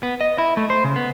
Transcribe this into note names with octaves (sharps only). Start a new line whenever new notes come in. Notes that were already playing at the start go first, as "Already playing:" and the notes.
B3
D#5
E4
A3
C5
C#3
B3